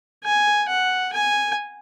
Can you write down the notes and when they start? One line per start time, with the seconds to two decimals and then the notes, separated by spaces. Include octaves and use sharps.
0.24 G#5
0.68 F#5
1.13 G#5